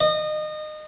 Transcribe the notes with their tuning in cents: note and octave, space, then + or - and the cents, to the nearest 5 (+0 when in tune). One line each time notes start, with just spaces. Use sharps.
D#5 -25